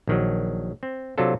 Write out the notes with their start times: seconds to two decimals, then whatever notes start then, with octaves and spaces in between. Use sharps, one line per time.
0.08 A#1 D#3 F#3
0.83 C4
1.18 C3 F#3 D4 F4 A4